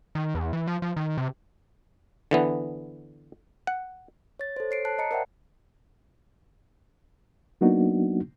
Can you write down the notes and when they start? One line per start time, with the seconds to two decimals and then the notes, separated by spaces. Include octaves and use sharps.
0.15 D#3
0.35 E2
0.53 E3
0.67 F3
0.82 F3
0.97 D#3
1.17 C3
2.31 D3 E3 B3
3.67 F#5
4.39 C#5 A6
4.56 A4 C5
4.71 C#5 C7 D7
4.85 A5 F#6 C7
4.98 D#5 A5 A#5 C#7
5.11 A#4 C5 D5 E5 F#5 G5
7.61 F#3 A#3 B3 D4 D#4 F#4